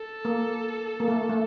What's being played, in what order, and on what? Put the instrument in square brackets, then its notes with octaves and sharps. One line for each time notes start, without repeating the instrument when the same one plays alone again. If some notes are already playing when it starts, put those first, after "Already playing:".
Already playing: [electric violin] A4
[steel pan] A#3
A#3
A3
A3